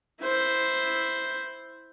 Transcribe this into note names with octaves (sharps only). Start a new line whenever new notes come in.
E4 C5